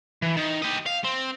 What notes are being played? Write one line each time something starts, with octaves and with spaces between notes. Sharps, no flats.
E3
D#3
G4 D#5
F5
C4